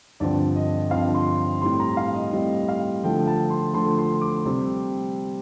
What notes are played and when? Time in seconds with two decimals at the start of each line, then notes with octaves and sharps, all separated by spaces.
0.20 G2 D3 F3 C4 D5
0.56 D#5
0.91 G2 D3 F3 C4 F5
1.14 C6
1.62 A2 G3 C4 C6
1.80 A#5
1.97 F5
2.14 D#5
2.32 A2 G3 C4 D#5
2.68 F5
3.03 D3 F3 A3 G5
3.27 A5
3.50 C6
3.74 D3 F3 A3 C6
3.98 C6
4.21 D6
4.45 C3 G3 C4